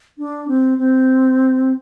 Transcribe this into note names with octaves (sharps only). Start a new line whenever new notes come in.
D4
C4
C4